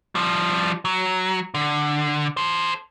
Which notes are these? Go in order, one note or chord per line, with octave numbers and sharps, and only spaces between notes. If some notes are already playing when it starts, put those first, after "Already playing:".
F3 G3
F#3
D3
A4 C5